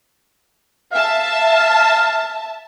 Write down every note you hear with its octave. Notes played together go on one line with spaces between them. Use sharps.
E5 F5 A5